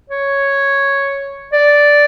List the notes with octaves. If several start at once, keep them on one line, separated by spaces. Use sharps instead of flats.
C#5
D5